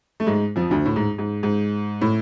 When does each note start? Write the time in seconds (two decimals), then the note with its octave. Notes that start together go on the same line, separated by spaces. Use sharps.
0.20 A3
0.27 G#2 G#3
0.56 F2 F3
0.70 D2 D3
0.86 A2
0.96 G#2
1.18 G#2
1.43 G#2
2.01 A2